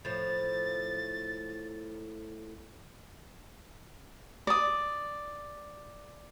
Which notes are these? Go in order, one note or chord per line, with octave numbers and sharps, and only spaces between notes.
A2 F3 A6
D5 D#6